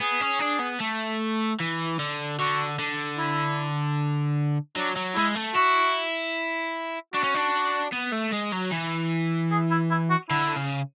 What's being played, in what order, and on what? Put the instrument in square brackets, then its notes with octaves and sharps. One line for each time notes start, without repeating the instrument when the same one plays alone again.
[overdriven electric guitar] B3 [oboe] G#4
[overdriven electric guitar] C#4
D4
B3
A3
E3
D3
[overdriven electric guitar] D3 [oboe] F#4
[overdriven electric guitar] D3
[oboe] E4
[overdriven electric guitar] F#3 [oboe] D4
[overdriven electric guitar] F#3
[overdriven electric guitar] G#3 [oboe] E4
[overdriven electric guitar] A3
[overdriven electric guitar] E4 [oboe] F#4
[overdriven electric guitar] D4 [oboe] F#4
[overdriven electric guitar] C#4
D4
B3
A3
G#3
F#3
E3
[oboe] G#4
E4
E4
F#4
[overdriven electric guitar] D3 [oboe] E4
[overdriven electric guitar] C#3